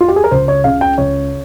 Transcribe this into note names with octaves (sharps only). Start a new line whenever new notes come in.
F4
G4
G#4
A#4
C#2 C5
C#5
C#3 F5
G5
C#2 C#5